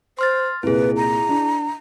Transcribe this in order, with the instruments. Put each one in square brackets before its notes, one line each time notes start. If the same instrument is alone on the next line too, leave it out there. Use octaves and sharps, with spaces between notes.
[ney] C5 [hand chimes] C6 F6 A6
[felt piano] C2 A#2 [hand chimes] E4 G#4 [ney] B4
[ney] A#5
[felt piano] D4